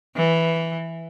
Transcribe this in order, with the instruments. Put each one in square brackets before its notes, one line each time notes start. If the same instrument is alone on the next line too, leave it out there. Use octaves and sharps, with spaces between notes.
[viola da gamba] E3